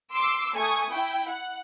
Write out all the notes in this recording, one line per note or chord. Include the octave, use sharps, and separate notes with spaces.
C6 D6 E6
A3 G#5 C#6 D#6
E4 G5
F#5